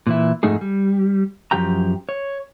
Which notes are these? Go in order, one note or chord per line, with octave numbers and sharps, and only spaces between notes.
A#2 E3 E4
F2 G#2 A3 D#4 G#4
G3
F#2 A#2 F3 G4 G5 A#5
C#5